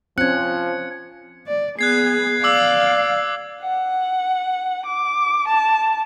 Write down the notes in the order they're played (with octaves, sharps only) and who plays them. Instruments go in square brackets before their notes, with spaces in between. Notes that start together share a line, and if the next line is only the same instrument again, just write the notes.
[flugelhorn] F3 [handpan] C4 C#4 [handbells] F#6 [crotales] G#6 C#7
[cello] D5
[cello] B3 G#4 [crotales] F#6 G#6 C7
[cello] D5 F5 [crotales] D6 E6 F#7
[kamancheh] F#5
D6
A5